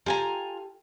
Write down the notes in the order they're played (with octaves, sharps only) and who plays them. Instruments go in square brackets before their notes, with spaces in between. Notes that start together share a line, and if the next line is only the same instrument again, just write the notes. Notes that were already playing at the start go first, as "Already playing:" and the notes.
[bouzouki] F4 G#5 A#5 [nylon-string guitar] G4 A4 G5